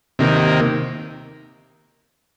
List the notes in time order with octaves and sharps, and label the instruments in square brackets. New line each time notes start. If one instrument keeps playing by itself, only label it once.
[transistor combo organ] C3 D#3 A#3